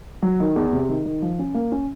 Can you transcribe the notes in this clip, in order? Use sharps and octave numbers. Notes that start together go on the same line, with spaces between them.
F#3
D#3
E2
C3
D#3
D#3
F3
C#4
A#3
C#4